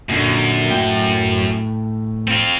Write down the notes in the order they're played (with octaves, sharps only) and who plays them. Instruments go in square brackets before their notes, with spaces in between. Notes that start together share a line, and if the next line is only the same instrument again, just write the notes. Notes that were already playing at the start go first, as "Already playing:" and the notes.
[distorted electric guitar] F#2 [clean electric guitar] A#2 D3
[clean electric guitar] A2 G5
[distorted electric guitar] C4 F4